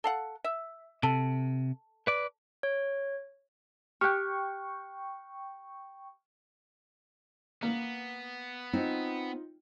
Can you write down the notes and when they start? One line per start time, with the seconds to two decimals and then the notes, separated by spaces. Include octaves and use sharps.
0.04 A4 F5 F#5
0.44 E5
1.03 C3 A4
2.07 B4 D5
2.63 C#5
4.01 G4 G5 C#6 F6 F#6
7.63 A#3 B3
8.73 C4 D#4 F4